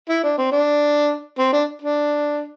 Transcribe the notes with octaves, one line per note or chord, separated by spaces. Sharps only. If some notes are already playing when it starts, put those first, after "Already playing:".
E4
D4
C4
D4
C4
D4
D4